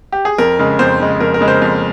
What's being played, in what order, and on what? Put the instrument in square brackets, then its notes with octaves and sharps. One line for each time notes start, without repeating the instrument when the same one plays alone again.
[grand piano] G4
G#4
F2 A#4
C#3 G#3
F2 C5
C#3 G#3
F2 A#4
A#4
C#3 G#3
C5
F2